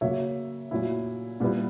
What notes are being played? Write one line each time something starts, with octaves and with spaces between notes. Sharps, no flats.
C#3 F#3 A#3 C#5 E5
A#2 F#3 C#4 E4
A#2 G3 B3 E4